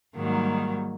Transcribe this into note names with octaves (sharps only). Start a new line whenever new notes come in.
G#2 D#3 F#3 G3 A#3